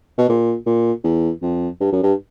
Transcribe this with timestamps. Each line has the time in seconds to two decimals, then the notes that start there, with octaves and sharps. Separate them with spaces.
0.18 B2
0.29 A#2
0.66 A#2
1.04 E2
1.42 F2
1.81 G2
1.92 F#2
2.03 G2